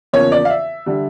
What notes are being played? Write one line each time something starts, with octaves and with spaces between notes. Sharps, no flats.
E2 C#3 F3 A#3 C#5
D5
F5
E5
D3 G3